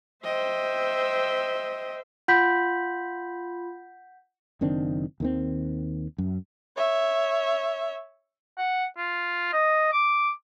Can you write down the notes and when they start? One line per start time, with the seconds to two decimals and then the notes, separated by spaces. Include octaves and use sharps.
0.24 C5 D#5 E5 G5
2.28 F4 F#5 B5 G6 B6
4.61 F#1 D#3 C4 D4
5.20 D#2 D#3 C4
6.18 F#2
6.77 C#5 E5
8.58 F#5
8.98 F4
9.53 D#5
9.93 D6